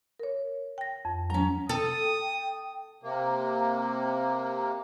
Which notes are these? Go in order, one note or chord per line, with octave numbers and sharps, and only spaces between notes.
A#4 C#5
G5 A#6
F2
F#3 C#4 A#5
A4 G5 D#6
C3 A#3